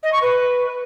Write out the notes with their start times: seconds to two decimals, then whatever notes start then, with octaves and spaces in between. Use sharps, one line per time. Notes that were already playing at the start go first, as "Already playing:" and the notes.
0.03 D#5
0.12 C#6
0.21 B4